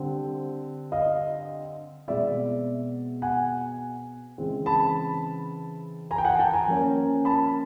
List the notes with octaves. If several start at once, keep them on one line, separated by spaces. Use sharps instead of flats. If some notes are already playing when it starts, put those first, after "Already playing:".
Already playing: D3 G3 C4
D#5 F5
B2 G#3 C4 D5 E5
F#5 G#5
C#3 E3 G#3 C4
A5 B5
G#5 A#5
G5
F#5 G#5
G5 A5
G#5 A#5
F3 A#3 C#4
A5 B5